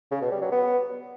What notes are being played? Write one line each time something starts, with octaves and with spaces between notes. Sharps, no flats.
C#3
B2
G3
F#3
B3